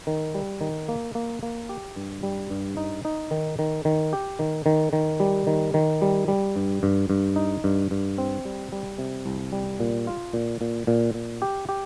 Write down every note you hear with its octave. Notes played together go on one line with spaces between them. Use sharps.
D#3
G3
D#3
A#3
A#3
A#3
G4
G2
G3
G2
D#4
D#4
D#3
D#3
D#3
G4
D#3
D#3
D#3
G3
D#3
D#3
G3
G3
G2
G2
G2
D#4
G2
G2
C4
G3
G3
C3
C2
G3
A#2
F4
A#2
A#2
A#2
A#2
G4
G4